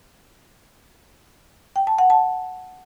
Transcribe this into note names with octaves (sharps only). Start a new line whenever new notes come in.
G5
A5
F#5
A5